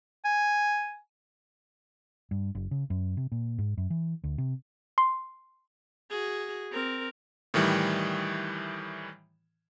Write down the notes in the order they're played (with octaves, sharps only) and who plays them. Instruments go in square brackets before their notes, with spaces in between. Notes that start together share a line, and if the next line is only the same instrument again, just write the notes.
[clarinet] G#5
[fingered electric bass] G2
F#1
C#3
F#2
C3
A#2
G#2
F#2
E3
D2
C3
[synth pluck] C6
[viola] F#4 G#4
C4 A#4
[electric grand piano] A2 D#3 E3 G3